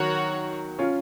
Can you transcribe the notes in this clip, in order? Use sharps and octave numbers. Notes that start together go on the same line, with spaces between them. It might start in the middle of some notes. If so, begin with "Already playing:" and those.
Already playing: D#3 F#3 F#4 A#4 C#5 F#5
C#4 F4